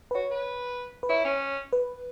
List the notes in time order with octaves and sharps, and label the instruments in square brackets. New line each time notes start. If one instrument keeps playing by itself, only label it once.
[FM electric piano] B4
[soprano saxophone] F#4 [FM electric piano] C#5
[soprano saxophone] B4
[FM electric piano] B4
[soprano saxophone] E4 [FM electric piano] C#5
[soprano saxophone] C#4
[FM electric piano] B4